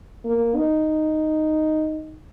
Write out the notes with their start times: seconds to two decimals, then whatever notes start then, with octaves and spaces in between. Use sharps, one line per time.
0.25 A#3
0.56 D#4